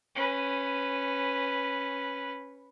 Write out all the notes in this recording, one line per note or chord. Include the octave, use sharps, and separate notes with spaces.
C#4 B4